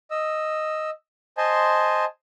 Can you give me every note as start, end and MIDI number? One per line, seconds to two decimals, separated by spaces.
0.11 0.90 75
0.11 0.90 88
1.37 2.05 72
1.37 2.05 75
1.37 2.05 80
1.37 2.05 81
1.37 2.05 84